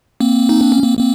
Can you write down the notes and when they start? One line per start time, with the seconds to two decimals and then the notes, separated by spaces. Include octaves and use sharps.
0.20 A#3 C4
0.49 D#4
0.61 D4
0.72 C#4
0.83 A#3 C4
0.99 A#3 C4